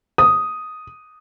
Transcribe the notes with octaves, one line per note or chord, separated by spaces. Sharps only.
D#6